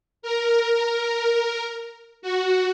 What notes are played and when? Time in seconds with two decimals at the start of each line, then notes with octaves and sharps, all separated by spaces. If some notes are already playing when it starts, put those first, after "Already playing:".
0.22 A#4
2.22 F#4